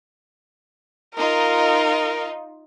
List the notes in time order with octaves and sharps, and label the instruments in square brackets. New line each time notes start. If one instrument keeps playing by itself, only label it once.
[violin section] D#4 F4 [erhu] A#4